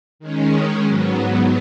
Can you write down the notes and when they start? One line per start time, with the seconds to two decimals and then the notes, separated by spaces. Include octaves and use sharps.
0.19 D#3 G#3 C#4
0.83 G#2 F#3 B3